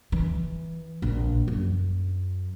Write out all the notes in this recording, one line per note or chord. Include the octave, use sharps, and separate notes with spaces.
E3
A#1
F#2